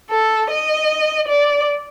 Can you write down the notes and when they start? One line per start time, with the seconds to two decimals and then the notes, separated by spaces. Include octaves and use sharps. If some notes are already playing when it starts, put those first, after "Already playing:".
0.10 A4
0.50 D#5
1.28 D5